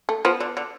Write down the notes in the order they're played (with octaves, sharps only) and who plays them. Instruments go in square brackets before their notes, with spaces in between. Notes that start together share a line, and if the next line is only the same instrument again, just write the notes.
[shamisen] A3
[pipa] F3 [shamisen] B3
[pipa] D3
D3